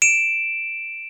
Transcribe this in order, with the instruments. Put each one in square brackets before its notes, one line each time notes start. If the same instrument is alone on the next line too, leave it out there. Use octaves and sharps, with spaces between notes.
[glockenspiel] D7 E7